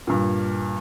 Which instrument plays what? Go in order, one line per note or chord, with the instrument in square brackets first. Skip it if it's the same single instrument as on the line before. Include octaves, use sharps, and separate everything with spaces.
[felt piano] G2 A#2